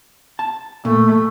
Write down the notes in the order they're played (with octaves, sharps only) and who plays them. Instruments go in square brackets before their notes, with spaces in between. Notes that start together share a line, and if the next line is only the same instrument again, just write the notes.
[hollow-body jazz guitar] A5
[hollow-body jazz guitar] A#2 [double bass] A3